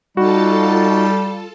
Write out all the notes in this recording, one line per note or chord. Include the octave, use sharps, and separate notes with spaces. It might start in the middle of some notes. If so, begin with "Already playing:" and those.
G3 D#4 F4 F#4 A4 A5